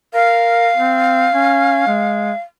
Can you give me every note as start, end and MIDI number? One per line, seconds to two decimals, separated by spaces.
0.14 0.70 70
0.14 2.40 77
0.77 1.28 60
1.33 1.83 61
1.87 2.32 56